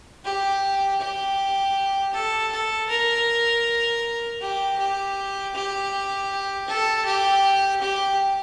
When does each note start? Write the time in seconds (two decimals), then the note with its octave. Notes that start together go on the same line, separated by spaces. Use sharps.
0.25 G4
1.01 G4
2.13 A4
2.52 A4
2.90 A#4
4.41 G4
4.79 G4
5.55 G4
6.68 A4
7.06 G4
7.81 G4